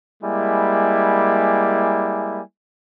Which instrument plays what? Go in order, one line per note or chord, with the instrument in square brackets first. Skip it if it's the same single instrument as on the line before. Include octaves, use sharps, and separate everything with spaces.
[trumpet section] G3 G#3 A#3 E4 G#5